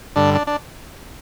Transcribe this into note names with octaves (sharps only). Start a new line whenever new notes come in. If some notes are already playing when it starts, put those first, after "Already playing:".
G2 D3 D4
D4
D4